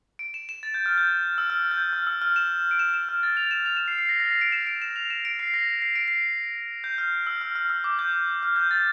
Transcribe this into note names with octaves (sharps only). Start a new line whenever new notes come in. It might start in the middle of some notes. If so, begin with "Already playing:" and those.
D7
E7
E7
A6
G6
F6
G6
E6
F6
G6
F6
E6
F6
E7
D7
E7
E7
F6
A6
F7
E7
F7
E7
C7
C7
A#6
A#6
C7
D7
E7
D7
E7
F7
E7
D7
C7
A#6
C7
D7
C7
G6
F6
E6
F6
F6
E6
D6
G6
F6
G6
A6